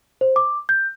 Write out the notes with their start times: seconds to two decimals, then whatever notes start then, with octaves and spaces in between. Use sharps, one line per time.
0.21 C5
0.36 D6
0.69 G6